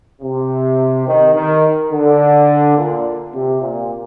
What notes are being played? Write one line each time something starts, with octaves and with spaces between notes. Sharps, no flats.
C3
D#3
D#3
D3
A#2
C3
A#2